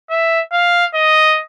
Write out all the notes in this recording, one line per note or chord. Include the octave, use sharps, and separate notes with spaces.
E5
F5
D#5